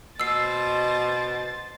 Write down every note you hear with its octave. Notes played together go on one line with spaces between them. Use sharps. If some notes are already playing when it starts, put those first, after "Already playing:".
B2 C5 E6 A6 C7